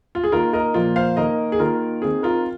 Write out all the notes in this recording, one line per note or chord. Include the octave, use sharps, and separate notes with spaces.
F4
G#4
D#3 A#3 F4 A#4
A#4 D#5
A#2 F3 A#3 F4
C5 F5
D#3 A#3 A#4 D#5
G#4
D#3 A#3 F4 A#4
D#3 C4 G#4
F4 A#4